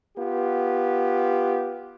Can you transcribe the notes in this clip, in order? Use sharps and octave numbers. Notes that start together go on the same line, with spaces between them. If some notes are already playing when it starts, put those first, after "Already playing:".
B3 F4 G4